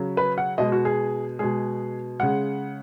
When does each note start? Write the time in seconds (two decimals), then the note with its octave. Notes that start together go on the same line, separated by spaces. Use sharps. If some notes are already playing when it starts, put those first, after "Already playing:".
Already playing: C#3 F#3
0.17 B4
0.38 F#5
0.58 B2 G#3 D#5
0.72 F#4
0.85 G#4
1.39 B2 G#3 G#4
2.20 C#3 G#3 F#5